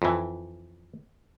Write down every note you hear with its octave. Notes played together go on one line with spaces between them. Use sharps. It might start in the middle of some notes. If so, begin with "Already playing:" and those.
F2 E3